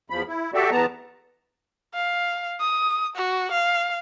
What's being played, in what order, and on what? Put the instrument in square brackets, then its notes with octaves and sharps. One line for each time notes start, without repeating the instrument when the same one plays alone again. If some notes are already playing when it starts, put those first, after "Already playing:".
[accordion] E2 F3 B5
E4
F#4 G4 A4 D5 E5
E2 B3 A5 A#5
[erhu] F5
D#6
F#4
F5